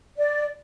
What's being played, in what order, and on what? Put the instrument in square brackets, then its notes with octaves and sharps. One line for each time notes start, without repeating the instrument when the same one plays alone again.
[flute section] D5